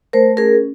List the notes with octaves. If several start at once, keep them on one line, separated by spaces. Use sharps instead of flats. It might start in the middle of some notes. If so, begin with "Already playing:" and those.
A3 A#4 C5
C#4 G#4 A#4